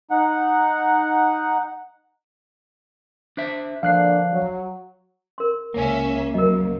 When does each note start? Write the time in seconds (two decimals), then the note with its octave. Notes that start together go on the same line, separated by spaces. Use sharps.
0.11 D#4 F#5
3.37 D4 C5 E5
3.83 D3 F3 A#3 D4 F5 F#6 C7
4.32 F#3
5.38 A#4 C6
5.74 C#2 A#3 C#4 E5
6.34 C#2 F#2 F3 F#3 A#4 D#5